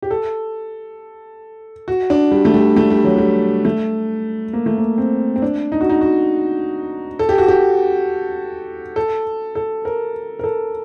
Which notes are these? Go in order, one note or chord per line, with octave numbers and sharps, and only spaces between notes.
G4
A4
F#4
D4
G3
A3
G3
A3
G3
F#3
G3
A3
A#3
A3
A#3
C4
C4
D4
D#4
F#4
D#4
F#4
A4
G4
F#4
G4
A4
A4
A#4
A#4
A4